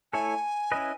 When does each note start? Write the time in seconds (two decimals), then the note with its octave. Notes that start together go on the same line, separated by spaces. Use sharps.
0.13 A3 E4 A4 C#5 G#5
0.72 C#4 E4 B4 D#5